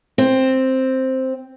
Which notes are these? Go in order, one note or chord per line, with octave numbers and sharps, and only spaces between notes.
C4